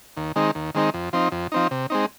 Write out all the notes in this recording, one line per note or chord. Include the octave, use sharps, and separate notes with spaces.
D#2
D#3 G#3 C4 D#4
D#2
D#3 G#3 C4 D#4
F2
F3 C4 D#4
F2
F3 C4 D#4
C3
G#3 C4 D#4